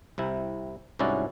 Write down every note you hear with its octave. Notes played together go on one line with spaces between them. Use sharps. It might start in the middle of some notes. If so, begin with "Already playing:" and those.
C2 C3 E4
C2 G#2 C#4 E4 F#4 D5